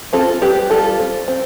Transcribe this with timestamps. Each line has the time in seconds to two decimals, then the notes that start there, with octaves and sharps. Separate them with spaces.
0.13 C4 F4 A4
0.42 G3 G4 B4
0.70 G3 F4 A4
0.99 C4
1.28 C4